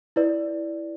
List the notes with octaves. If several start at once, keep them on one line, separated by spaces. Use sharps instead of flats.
E4 B4 D5